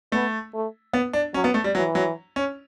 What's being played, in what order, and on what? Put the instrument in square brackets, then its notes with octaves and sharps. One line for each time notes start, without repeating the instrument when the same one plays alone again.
[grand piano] A3 [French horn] B3
[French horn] A3
[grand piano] B3
D4
[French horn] F#3 [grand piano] C#4
[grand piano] B3
A3
G3
[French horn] E3 [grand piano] F#3
[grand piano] F#3
C#4